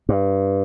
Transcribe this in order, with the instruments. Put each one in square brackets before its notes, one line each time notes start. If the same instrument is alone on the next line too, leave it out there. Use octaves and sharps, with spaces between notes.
[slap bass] G2